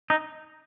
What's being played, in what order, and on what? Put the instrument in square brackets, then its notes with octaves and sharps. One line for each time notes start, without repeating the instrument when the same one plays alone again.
[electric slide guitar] D#4